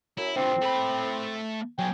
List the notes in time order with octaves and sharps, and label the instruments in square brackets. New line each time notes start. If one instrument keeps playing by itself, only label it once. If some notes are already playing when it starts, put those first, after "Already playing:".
[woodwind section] F#2 [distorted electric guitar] E4
[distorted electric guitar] G2 F3 [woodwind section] C4
[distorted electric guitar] A3 B5
[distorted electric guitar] F#3 B3 [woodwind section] G5 G#5